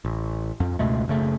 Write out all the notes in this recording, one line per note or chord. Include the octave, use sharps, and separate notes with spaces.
A1
F2
C#2 B2 G#3 A3
F#1 C#3 A3